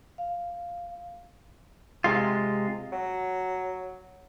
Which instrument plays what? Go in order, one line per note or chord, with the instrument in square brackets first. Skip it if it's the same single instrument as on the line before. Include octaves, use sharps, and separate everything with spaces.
[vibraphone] F5
[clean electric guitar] C3 G#3 F4
[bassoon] F#3